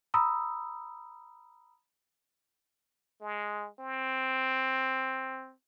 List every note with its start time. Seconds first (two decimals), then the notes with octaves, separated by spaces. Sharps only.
0.14 A#5 B5 D#6 E6
3.21 G#3
3.79 C4